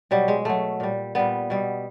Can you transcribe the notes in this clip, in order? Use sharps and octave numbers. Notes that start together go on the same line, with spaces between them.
B2 F#3 G3
G#3
B2 F#3 A3
A#2 G3
A#2 G3 B3
B2 G3